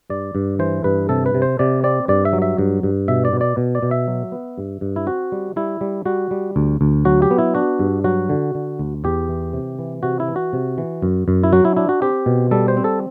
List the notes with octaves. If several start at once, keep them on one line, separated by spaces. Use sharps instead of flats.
G2 D5
G2
E3 C5
G2 B4
C3 A4
B4
C3
C5
C3 D5
C4 D5
G2 D5
E5
F#3
E5
G2
G2
B2 E5
D5
B2
D5
B2
D5
B2
E5
F#3
B3
G2
G2
E4
C4 F#4
G3
G3 E4
G3
G3 F#4
G3
D2
D2
F#3 F#4
G4
B3
E4
D4 F#4
G2
F#3 F#4
D3
D3
D2
E2 G4
E3
C3
E3
C3 F#4
E4
E3
F#4
C3
E3
F#2
F#2
E4
F#3 F#4
E4
D4 E4
F#4
C4 G4
B2
G3 A4
C5
C4
A4